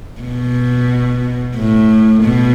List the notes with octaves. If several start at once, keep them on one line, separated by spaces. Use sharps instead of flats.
B2
A2
B2